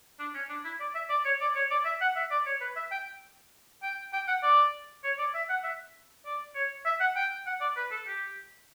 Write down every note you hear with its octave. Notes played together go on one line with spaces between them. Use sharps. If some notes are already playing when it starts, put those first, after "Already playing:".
D4
C#4
D4
E4
D5
E5
D5
C#5
D5
C#5
D5
E5
F#5
E5
D5
C#5
B4
E5
G5
G5
G5
F#5
D5
C#5
D5
E5
F#5
E5
D5
C#5
E5
F#5
G5
F#5
D5
B4
A4
G4